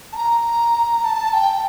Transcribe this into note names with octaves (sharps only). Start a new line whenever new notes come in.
A5
A#5
A5
G5